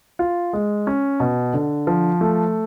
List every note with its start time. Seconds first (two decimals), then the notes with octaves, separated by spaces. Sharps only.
0.19 F4
0.53 G#3
0.87 C#4
1.20 B2
1.53 D3
1.87 F3
2.21 A3